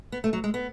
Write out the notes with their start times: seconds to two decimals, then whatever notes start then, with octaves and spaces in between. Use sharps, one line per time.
0.12 B3
0.24 A3
0.33 F#3
0.44 G#3
0.54 B3